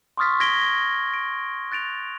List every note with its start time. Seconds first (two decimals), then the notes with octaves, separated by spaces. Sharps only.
0.17 C6 C#6 D#6 F6 A6 B6
0.40 C6 G#6 A#6 B6 D7 G7
1.14 D7
1.71 F#6 A6 D7 F7